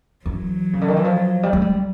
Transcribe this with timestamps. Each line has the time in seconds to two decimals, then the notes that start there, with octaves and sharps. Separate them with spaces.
0.25 E3 F#3
0.73 C#3
0.81 D3
0.88 D#3
0.97 E3
1.04 F3
1.43 G3
1.53 G#3
1.62 G3